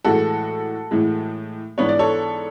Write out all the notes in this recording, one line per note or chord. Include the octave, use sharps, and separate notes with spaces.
A2 E3 G#3 F#4 A4
A2 E3 G#3
G#2 E3 B3 D4 C#5
D5
A4 C#5